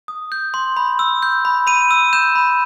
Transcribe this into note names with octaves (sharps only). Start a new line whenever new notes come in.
D#6
G6
C6
B5
E6
G6
B5
B5 D#7
E6
G6 E7
B5